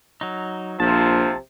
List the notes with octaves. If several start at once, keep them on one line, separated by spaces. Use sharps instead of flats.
F#3 D#4
A#1 C3 F3 A5